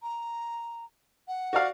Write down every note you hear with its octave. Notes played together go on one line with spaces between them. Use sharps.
A#5
F#5
F#4 D5 F5